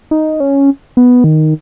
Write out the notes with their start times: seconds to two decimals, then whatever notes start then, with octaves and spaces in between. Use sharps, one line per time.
0.11 D#4
0.40 C#4
0.97 B3
1.24 D#3